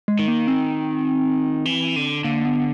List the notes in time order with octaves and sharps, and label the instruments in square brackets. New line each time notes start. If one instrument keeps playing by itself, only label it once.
[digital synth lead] G#3
[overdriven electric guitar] D#3
[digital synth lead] A#3
C4
[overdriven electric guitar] E3
D3
[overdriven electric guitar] D3 [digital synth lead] A#3
[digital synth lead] B3